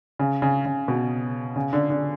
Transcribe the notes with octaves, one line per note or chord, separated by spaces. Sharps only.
C#3
C#3
C#3
B2
C#3
D3
D3